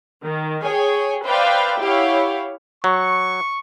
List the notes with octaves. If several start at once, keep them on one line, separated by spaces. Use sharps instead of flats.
D#3
G#4 C#5 G5 G#5
B4 C5 D5 E5 F5 G5
E4 G4 C#5 F5 F#5
F#3 C#6